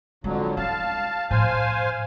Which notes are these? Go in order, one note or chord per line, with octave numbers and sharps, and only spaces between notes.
F2 D3 F#3 G#3
E4 F5 A5
A2 F3 C5 F5 G#5